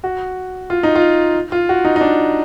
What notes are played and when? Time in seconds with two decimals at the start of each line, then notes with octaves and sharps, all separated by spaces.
0.04 F#4
0.70 F4
0.83 D#4
0.95 F4
1.52 F4
1.69 F#4
1.85 D#4
1.96 D#4
2.01 D4